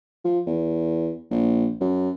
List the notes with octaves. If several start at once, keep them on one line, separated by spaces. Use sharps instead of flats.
F3
E2
A#1
F#2